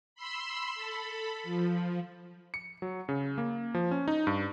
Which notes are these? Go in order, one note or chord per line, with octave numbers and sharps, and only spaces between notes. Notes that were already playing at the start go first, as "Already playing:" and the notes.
B5 C6 E6
A4 B5
F3
C#7
F#3
C#3
A#3
F3
C#4
D#4
G2